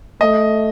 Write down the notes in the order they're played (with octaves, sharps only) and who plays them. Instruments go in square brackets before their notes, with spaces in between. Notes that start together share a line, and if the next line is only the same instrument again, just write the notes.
[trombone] A3 [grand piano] D#5